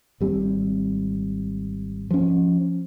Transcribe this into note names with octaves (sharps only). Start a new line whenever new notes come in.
G#1 G3 C4
F3 C#4